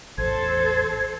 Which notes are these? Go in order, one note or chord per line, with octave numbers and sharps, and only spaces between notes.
A1 E2 A4 C5 G#6